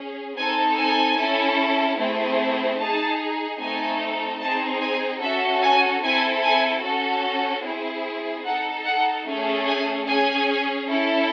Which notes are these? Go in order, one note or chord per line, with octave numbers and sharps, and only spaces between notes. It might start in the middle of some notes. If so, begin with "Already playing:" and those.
Already playing: C#4 G#4
C4 D#4 A4 G#5
G#5
C#4 E4 A4
A3 C4 E4 G#4
D#4 G#4 A5
A3 C4 D#4 A4 G#5
C4 D#4 G#4 A5
G#5
C#4 F#4 A4 E5
G#5
C4 E4 A4 G#5
G#5
C#4 F#4 A4
C4 E4 G#4
D#4 A4 F#5
F#5
A3 C#4 G#4
G#5
C#4 G#4 G#5
C#4 E4 A4